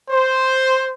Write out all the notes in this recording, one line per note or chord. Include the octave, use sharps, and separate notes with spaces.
C5